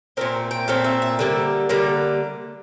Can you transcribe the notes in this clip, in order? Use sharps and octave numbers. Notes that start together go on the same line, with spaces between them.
A#2 A3 C4 A#4
G5
A#2 A3 C4 F5
E5
E5
D3 G3 A#3
D3 G3 A#3